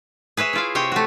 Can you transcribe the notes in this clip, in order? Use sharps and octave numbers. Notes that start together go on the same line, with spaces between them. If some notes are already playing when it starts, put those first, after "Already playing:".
G#4 B4 C#5 E5
E4 F4 F5
C3 C#5 G5
A3 F#4